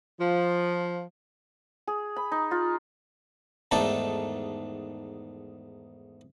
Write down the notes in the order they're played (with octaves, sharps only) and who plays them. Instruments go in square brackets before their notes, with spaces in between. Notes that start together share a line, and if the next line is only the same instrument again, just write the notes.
[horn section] F3
[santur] G#4
B5
D#4
F4
[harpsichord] E2 G#2 D#3 A3 A4 D5